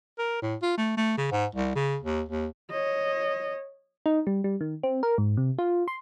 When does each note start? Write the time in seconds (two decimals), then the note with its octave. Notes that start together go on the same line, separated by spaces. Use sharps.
0.18 A#4
0.42 A2
0.62 F4
0.77 A3
0.97 A3
1.17 C#3
1.31 G#2
1.55 C2
1.75 C#3
2.02 D#2
2.28 D#2
2.70 C#5 D#5
4.06 D#4
4.27 G3
4.44 G3
4.61 D#3
4.83 C4
5.03 A#4
5.18 G#2
5.37 C3
5.58 F4
5.88 C6